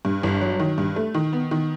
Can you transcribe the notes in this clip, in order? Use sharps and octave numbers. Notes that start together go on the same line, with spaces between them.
G2
G1
F#3
D#3
G2
A3
D#3
B3
D#3